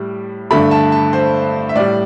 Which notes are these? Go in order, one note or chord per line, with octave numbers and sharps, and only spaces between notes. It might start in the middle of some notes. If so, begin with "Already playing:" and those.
Already playing: A2 G3
G2 D3 A3 B5
A5
A5
C5
E5
A2 G3 D5